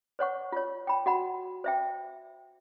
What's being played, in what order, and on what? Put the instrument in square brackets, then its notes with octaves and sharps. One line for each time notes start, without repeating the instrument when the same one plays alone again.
[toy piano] C5 C#5 F#5 C#6
F4 C#5
G5 B5
F#4 F#5 B5
C5 E5 G5